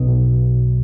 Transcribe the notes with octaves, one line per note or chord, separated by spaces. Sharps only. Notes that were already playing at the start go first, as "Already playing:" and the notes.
Already playing: B1 B2